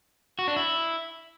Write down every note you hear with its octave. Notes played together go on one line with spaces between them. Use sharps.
F#4
D4
E4